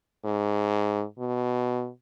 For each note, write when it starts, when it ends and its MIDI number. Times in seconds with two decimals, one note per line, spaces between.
0.24 1.04 44
1.19 1.89 47